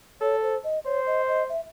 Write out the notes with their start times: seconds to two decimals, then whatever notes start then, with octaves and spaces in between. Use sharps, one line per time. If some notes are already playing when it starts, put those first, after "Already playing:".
0.21 A4 C#5
0.42 C5
0.64 D#5
0.85 C5 C#5
1.06 D#5
1.28 D#5
1.49 E5